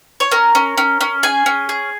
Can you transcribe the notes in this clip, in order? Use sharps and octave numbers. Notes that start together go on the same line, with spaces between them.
C#5
C#4 A#4
C#4
C#4
C#4
G#4 G#5
C#4
G#4